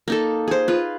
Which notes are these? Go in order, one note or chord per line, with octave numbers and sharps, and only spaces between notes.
A#3 D#4 A4
G#4 C5
F4 B4